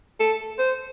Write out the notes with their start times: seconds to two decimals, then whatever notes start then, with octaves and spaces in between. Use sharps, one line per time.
0.20 A4
0.58 C5